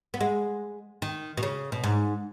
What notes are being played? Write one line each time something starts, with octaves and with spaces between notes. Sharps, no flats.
B3
G#3
D#3
B2
C#3
B2
G#2